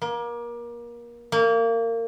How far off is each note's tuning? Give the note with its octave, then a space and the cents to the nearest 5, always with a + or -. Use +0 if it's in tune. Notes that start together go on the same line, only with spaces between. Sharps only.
A#3 +30
A#3 -25